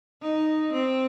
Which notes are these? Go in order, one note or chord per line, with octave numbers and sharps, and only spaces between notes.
D#4
C4